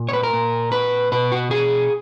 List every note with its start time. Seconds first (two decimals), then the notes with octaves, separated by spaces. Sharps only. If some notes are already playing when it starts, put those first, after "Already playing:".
Already playing: A#2
0.09 C#5
0.13 B4
0.23 A#4
0.33 A#2
0.72 B4
1.12 B2 B4
1.32 F#4
1.51 G#4